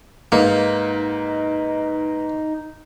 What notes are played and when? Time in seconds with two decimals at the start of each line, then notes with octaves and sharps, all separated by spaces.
0.32 G#2 A#3 D#4 B4 D#5